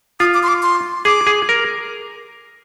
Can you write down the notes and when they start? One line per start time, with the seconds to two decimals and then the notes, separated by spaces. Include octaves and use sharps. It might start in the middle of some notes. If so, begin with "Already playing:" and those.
0.20 F4 D#6
0.34 D6
0.43 C6
0.48 D6
0.63 C6
1.05 G#4 D6
1.27 G#4
1.49 A#4